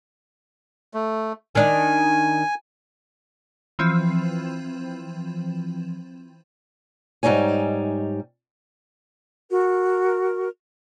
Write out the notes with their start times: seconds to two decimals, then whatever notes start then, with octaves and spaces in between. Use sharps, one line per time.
0.94 A3
1.55 D#3 D4 D#4 G#5
3.79 E3 F3 C4
7.23 G#2 G3 D#4 C#5 G#5
9.51 F#4 A#4